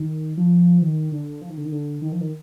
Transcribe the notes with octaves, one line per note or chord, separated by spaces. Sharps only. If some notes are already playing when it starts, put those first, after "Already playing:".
Already playing: D#3
F3
D#3
D3
F3
D#3
D3
D#3
D3
D#3
F3
D#3